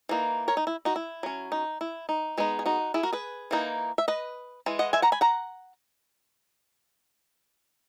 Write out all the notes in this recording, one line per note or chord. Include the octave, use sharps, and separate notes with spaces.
E3 A#3 D#4
A#4 C#5
D#4
E4
D#4 F#4
E4
F#3 C#4
D#4
E4
D#4
G#3 B3 D#4
G#4
D#4 F#4
E4 G#4
F#4 A#4
G#4 B4
E3 A#3 D#4
E5
B4 D#5
E3 G#3
D#5 F#5
E5 G#5
F#5 A#5
G#5 B5
F#5 A#5